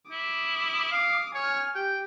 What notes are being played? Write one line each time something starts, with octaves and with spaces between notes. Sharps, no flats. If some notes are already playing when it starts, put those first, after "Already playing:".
E4 D6 D#6
F5
C#5 G#5 F6
G4 G5